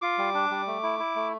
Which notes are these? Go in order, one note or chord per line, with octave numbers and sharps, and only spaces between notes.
F4 D6
G3
D4
G3
A3
E4
E4
A3